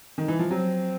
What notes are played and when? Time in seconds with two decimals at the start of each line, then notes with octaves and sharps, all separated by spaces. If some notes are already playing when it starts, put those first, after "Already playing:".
0.18 D#3
0.28 E3
0.39 F3
0.50 F#3 C4